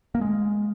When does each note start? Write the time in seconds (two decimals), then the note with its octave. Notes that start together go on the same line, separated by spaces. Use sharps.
0.15 A#3
0.21 G#3